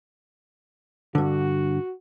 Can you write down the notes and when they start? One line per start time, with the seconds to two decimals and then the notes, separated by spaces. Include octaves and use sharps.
1.15 G2 D3 F#4